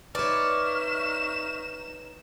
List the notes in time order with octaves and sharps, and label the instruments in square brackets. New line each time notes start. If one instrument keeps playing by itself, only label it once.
[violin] D#4 E7 [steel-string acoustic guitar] B4 C#5 [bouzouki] D5 [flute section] E5 C#6 F6